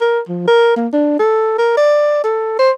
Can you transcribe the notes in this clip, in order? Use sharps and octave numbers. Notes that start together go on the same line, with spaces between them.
A#4
F3
A#4
A#3
D4
A4
A#4
D5
A4
C5